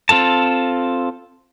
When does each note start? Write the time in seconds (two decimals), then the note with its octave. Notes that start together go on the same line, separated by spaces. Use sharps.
0.09 C4 F4 A4 A5